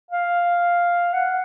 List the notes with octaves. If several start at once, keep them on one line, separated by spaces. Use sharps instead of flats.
F5
F#5